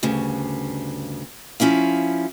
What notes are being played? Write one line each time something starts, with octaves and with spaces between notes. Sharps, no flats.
D2 G2 C#3
F3 C#4 E4 F5